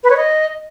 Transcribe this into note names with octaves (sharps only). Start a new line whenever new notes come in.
B4
C#5
D#5